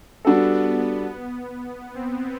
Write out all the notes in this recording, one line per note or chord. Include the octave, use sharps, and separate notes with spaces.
G3 B3 D4 F#4 A4
B3
B3
C4